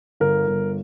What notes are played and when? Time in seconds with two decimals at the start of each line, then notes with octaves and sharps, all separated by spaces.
0.20 G1 A#4
0.47 G1